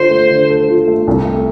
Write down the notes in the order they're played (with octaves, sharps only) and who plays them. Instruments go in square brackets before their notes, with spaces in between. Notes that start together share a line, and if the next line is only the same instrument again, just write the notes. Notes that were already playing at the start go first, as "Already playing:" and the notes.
Already playing: [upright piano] D3 F4 A4 [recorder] C5
[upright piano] A3
D3
A4
F4
A3
C2
A3